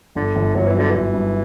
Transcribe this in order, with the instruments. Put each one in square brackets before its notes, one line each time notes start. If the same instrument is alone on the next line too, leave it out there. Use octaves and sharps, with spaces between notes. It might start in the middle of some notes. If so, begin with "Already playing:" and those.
[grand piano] G1 [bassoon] D3
[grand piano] G1
[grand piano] G1 [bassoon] F#3
[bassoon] E3
[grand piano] F#3
[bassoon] D3
[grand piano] G1 [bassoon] E3
[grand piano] G2